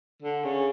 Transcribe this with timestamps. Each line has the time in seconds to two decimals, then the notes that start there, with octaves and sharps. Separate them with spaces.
0.22 D3
0.44 C#3